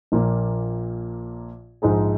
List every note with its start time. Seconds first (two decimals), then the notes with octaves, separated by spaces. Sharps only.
0.12 A#1 A#2 A#3
1.82 A#1 G#2 G#3 D#4 G#4